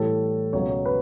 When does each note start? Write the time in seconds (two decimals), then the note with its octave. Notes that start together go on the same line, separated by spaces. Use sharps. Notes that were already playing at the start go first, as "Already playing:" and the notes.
Already playing: A2 E3 G3 A4
0.53 C#2 B2 F#3 C#5
0.69 C#5
0.85 B4